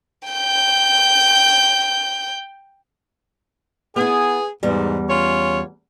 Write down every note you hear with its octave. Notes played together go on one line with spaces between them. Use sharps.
G5 G6
B3 E4 G#4
E2 G#2 G3
C#4 F4 C#5